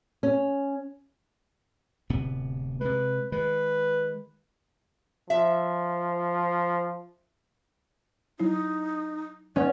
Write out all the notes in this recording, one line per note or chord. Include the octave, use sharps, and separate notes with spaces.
C#4
D1 C3 B3
C3 G#3 B4
D#3 G#3 B4
F3 E5
F#3 D#4 E4
C#4 B4 C#5 D5 F#5